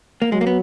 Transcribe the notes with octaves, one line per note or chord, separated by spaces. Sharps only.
A#3
F#3 G#3
A#3
B3